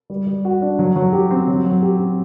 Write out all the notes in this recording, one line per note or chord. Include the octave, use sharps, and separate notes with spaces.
G3
G3
F#4
D4
F#3
F#3
G4
C4
F#3
F#3
G4
C4